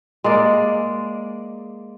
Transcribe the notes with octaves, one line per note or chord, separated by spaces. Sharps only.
G#3 A#3 D5